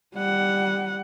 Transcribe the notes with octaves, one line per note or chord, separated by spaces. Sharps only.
G3 F#5